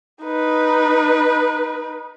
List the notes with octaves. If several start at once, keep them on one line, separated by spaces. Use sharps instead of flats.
D#4 B4